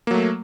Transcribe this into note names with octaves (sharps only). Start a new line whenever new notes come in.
F#3 A3 A#3